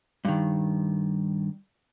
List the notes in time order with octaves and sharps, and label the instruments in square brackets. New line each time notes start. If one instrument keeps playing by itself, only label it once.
[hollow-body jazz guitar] G2 D#3